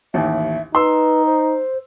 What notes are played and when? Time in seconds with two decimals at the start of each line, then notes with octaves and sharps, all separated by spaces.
0.14 A1 D#2 E5
0.75 D#4 B4 C6 E6
1.26 C5